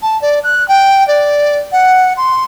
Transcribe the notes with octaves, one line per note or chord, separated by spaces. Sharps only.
A5
D5
F#6
G5
D5
F#5
C6